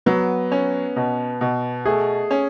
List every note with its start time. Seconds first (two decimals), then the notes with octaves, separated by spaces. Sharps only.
0.06 F#3 B3
0.51 C#4
0.96 B2
1.41 B2
1.86 A3 G#4
2.31 C#4